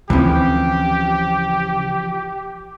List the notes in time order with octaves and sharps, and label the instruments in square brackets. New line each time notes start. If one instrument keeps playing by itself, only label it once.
[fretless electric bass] D2 C4 [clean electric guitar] C#3 [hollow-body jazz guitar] E3 F3 [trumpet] G4